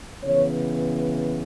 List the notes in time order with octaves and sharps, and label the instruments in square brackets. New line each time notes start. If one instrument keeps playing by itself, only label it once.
[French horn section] C#3 E3 B3 C#5